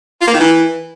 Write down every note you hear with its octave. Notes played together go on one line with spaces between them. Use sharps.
F4
A#3
D#3
E3